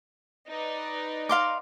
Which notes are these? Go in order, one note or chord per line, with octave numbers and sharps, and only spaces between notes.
D#4 B4 D5
F5 C6 D6